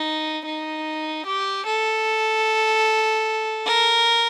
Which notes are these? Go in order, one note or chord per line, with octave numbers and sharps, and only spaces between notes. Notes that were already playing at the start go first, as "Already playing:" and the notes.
Already playing: D#4
D#4
G4
A4
A#4